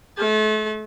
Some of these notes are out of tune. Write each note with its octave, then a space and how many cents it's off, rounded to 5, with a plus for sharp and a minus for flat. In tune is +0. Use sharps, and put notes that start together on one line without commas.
A3 -35 A5 -35